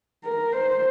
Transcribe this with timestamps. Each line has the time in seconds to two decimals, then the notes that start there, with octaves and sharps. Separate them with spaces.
0.24 A#4
0.53 C5